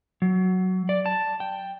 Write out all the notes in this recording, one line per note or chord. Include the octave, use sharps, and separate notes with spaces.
F#3
D5
A5
G5